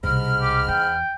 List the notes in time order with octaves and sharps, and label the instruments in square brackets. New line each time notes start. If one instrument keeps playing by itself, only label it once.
[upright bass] C2 B2 [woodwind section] G#2 B5 F6
[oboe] G4
[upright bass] E2 [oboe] G5